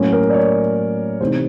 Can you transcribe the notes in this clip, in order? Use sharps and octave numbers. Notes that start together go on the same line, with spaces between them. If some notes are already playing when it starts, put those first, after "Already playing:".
Already playing: A2 F#3 A#3 C#4
A#4
D5
C#5
C3 E3 A3 C4 D#4 C5